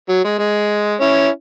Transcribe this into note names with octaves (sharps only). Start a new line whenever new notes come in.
F#3
G#3
G#3
C#4 E4